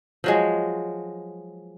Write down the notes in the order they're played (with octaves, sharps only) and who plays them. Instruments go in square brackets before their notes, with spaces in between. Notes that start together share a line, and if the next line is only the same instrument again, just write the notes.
[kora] F3 F#3 G#3